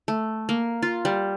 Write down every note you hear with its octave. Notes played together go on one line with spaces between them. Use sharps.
A3
A#3
F4
G3